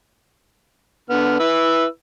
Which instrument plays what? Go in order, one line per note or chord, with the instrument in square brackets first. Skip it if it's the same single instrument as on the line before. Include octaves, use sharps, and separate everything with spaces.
[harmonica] D3 B3 F6
E4 B4 E6